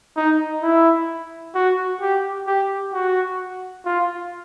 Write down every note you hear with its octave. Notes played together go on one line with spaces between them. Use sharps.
D#4
E4
F#4
G4
G4
F#4
F4